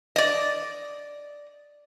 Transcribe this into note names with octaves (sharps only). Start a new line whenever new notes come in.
D5 D#5